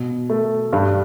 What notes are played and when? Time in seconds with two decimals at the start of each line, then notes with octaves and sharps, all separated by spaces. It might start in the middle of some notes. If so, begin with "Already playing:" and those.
Already playing: B2
0.30 A3
0.73 G2